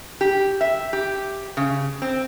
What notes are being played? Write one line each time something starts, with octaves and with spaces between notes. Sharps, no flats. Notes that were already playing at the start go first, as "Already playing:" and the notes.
G4
E5
G4
C#3
C4